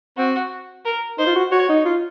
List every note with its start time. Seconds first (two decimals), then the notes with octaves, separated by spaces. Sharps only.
0.17 C4 F#4
0.85 A#4
1.18 D#4 C5
1.27 F4
1.35 F#4
1.52 F#4 C#5
1.69 D#4
1.85 F4